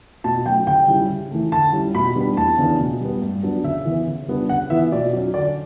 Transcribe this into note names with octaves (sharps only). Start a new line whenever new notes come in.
B2 A5
F#3 A3 C#4 G5
C#3 G5
G3 C#4 E4
C#3
E3 A3
D3 A5
G3 C#4 E4
B2 B5
G3 B3 D4
E2 A5
C#3 E3 B3 D4
B2
G3 B3
G2
F#3 B3 D4
C#3 E5
E3 B3
C#3
G3 B3 D4
C#3 F#5
E3 B3 E4 E5
B2 D5
F#3 C#4
D3 D5